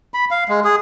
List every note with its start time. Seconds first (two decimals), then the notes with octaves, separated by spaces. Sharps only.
0.14 B5
0.31 F5
0.49 G#3
0.64 G#4